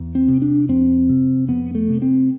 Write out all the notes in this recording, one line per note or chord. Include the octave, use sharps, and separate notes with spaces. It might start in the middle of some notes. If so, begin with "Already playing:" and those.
Already playing: E2
C4
C3
D4
F2 C4
C3
F2 B3
A3
C3
C4